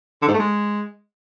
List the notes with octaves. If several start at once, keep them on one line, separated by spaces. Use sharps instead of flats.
D3
G#2
A3
G#3